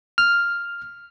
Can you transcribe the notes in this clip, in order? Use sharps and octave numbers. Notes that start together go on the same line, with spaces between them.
F6